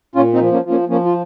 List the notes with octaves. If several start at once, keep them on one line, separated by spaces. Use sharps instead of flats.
A#2 C#4 F4
C4 D#4
F3
A#3 C#4
F3
A#3 C#4
F3 A#3 C#4
F4